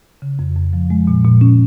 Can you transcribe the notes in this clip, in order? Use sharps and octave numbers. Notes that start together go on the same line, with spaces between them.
C#3
F2
F2
F3
G#3
A#2
A#2
C#4